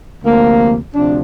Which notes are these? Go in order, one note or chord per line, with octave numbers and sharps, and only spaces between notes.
D2 C3 F3 A#3
D2 C3 F3 D4